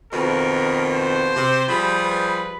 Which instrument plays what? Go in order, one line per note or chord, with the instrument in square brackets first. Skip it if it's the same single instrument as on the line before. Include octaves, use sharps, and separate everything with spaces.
[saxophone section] F2 B2 D#3 [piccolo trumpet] A#4
[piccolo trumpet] C5
[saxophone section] C3
[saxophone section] F3 G3 G#4 [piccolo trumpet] B5
[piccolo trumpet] B4